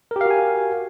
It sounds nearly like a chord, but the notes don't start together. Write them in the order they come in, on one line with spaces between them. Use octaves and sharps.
A#4 G4 F5 F#4 G#5